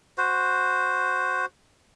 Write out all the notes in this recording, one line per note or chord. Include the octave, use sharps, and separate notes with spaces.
F#4 C5